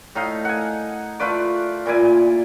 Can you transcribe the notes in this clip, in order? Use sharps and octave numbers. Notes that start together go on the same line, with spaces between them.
A2 D#4 D#5 F5
F#5 G#5
A3 F4 B4 D5
A#2 E4 D5 G#5